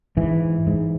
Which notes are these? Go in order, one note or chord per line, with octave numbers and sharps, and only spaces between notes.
G#2 E3
G#2